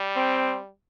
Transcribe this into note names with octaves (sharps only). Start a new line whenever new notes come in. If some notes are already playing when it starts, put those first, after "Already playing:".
Already playing: G3
C4